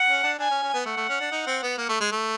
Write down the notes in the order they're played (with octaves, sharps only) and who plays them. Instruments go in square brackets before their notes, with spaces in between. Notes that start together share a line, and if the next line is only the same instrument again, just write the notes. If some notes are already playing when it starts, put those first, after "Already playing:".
Already playing: [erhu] F#5
[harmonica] C#4
D4
[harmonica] D4 [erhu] G#5
[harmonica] C#4
C#4
B3
[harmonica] A3 [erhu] F#5
[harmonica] A3
C#4
D4
D#4
C4
B3
A#3
A3
G#3
A3